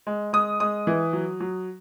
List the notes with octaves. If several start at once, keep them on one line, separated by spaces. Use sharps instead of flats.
G#3
G#3 D#6
G#3 D#6
E3
F#3
F#3